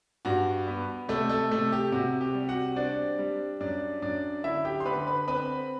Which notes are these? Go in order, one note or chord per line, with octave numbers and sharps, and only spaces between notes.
G2 F#4
B3
C3 A3 A4
A3 A4
C3 A3 A4
G4
C3 F#4
G4
G3
F#4 F#5
C4 D4 D5
G3
F#2 D4 D5
F#2 D4 D5
D3 E4 E5
G4 G5
C6
D3 B4 B5
B4 B5
C4 B4 B5